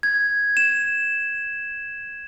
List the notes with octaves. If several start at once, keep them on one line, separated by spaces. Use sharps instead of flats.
G#6
E7